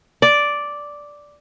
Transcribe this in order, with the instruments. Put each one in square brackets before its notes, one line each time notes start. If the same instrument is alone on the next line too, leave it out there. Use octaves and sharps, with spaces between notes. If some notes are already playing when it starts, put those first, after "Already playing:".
[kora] D5